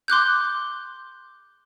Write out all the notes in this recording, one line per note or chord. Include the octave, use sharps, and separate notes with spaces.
C6 D6 F#6 G6